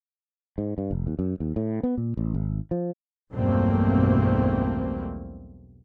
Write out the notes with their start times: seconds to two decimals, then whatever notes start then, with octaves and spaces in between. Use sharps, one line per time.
0.58 G#2
0.78 G2
0.91 F1
1.07 D#2
1.19 F#2
1.40 D#2
1.56 A2
1.83 B3
1.97 A#2
2.17 A1
2.34 G#1
2.71 F3
3.33 B1 E2 G2 A3 A#3 C4